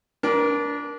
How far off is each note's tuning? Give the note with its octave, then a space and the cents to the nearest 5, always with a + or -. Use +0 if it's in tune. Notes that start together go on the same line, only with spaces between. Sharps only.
D4 -20 A#4 +20